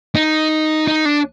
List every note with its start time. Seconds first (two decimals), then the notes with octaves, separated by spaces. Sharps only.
0.15 D#4
0.88 D#4
1.05 D4